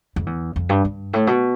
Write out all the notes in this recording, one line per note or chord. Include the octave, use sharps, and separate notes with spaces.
F2
E2
F2
G2
G2
A2
B2